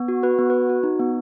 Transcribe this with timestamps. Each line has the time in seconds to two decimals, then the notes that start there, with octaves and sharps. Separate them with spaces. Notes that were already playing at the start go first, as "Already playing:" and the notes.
Already playing: B3
0.08 F#4
0.23 F#4 B4
0.38 B3
0.50 F#4 B4
0.69 F#4
0.83 D#4
0.99 B3